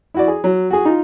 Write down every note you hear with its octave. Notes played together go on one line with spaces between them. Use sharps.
E4 F#4 D5
G#4
F#3
F#4 G#4
D#4 F4